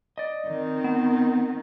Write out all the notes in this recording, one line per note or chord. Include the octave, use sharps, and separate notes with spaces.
D5 D#5
D#3 C4
B3